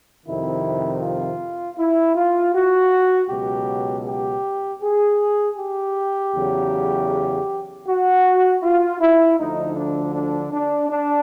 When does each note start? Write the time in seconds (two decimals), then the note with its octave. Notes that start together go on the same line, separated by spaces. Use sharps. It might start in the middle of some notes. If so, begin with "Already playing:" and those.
0.25 F2 C3 D#3 E4
1.01 F4
1.77 E4
2.15 F4
2.54 F#4
3.29 C#2 B2 F#3 G4
4.06 G4
4.81 G#4
5.58 G4
6.34 E2 C#3 F#3
7.86 F#4
8.62 F4
9.01 E4
9.38 D2 D3 F3 D#4
9.76 D4
10.14 D4
10.52 D4
10.90 D4